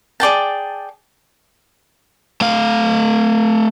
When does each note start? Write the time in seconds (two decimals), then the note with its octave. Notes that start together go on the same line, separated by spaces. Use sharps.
0.20 G#4 D5 G5 A5
2.41 A3 F5